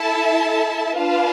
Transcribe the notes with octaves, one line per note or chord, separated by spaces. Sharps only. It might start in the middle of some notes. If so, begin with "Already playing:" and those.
Already playing: E4 A4 E5 A5
D4 F4 B4 F5 A5